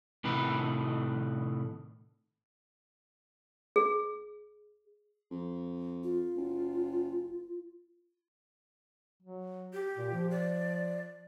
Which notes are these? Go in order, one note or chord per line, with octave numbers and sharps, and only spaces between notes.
A2 C3 D#3 B4
G#4
F2
F4
F#1
F#3
G4
A#2
F3
D5